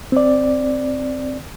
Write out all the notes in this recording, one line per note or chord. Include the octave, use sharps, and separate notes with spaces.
C4 D5